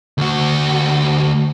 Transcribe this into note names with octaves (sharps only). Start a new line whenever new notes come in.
D2 F#4